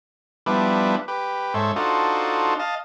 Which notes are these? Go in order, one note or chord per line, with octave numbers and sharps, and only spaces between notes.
F3 G3 B3 D4 E4 B4
G4 B4
G#2 A4 C5 C#5 E5
D4 D#4 F4 F#4 A4 C5
D#5 F5 A5